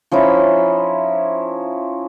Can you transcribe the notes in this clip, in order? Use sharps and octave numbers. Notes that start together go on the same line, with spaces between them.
F3 C#4 D#4 E4